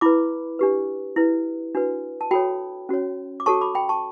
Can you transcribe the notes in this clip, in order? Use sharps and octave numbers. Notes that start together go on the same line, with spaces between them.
E4 B4 B5 D6
D4 G4 B4
E4 B4
D4 F#4 B4
A5
F#4 A4 C#5 G5 B5
C#4 F#4 C#5
D6
F#4 A4 C#5 A5 C#6
B5 D6
G5 B5
A5 C#6